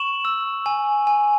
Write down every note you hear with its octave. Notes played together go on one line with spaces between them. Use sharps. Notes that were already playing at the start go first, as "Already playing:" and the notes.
Already playing: C#6 E7 F#7
E6
G#5
G#5